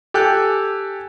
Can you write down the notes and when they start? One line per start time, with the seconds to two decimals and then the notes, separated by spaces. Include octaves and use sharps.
0.14 G4 A4 G5 G#5 F#6